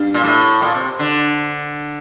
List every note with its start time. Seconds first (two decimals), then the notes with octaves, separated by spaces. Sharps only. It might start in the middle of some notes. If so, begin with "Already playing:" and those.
Already playing: G2
0.14 A#2
0.24 A2
0.62 A#2
0.74 C3
0.99 D3